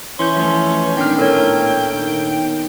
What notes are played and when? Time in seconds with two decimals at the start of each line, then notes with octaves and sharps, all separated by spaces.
0.19 E3 C#4 C6 G6
0.36 F3 A3 A4
0.97 A#2 D#3 B3 C#4 D4 G5 F6
1.19 A2 A4 A#4 C#5
1.92 D#3